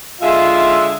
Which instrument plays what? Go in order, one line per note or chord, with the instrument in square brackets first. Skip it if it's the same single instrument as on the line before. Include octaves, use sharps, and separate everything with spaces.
[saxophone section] D3 G#3 E5 [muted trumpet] F4